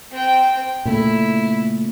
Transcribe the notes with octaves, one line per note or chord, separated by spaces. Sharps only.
C4 G5
A#2 C#3 A3 E4